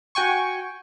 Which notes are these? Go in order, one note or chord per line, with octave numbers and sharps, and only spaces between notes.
F#4 G5 G#5 C#6